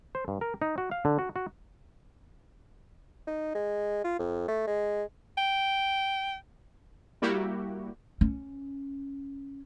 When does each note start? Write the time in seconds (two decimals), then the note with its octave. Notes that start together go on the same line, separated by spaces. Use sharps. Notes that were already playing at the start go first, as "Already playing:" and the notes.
0.15 C5
0.28 G2
0.41 A#4
0.62 D#4
0.78 F#4
0.91 F5
1.05 D3
1.19 F#4
1.36 F#4
3.27 D#4
3.55 G#3
4.04 F4
4.19 F2
4.48 A3
4.67 G#3
5.38 G5
7.22 G3 A#3 E4 F#4 G4
8.21 C#4